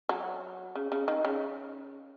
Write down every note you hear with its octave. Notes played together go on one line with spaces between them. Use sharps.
F#3
C#3
C#3
D#3
C#3